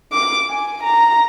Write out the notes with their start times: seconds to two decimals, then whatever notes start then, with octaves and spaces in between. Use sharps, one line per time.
0.12 D6
0.50 G#5
0.83 A#5